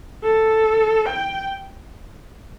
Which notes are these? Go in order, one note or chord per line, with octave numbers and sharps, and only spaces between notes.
A4
G5